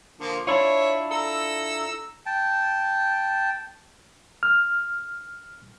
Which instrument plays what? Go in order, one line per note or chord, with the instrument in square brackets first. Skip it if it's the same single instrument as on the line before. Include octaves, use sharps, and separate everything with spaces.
[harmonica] D3 F3 A#3
[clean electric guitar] D4 E4 F4 [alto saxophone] C#5 [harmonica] E5
[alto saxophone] A4 [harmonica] A#5 E6
[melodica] G5 A5
[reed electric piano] F6